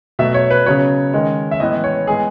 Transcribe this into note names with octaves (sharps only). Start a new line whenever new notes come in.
B2 F#3 A3 E5
C#5
B4
C#3 F#3 B3 C#5
D#3 G#3 C#4
E5
A2 E3 G#3 B3 D#5
C#5
A2 G#3 B3 G#4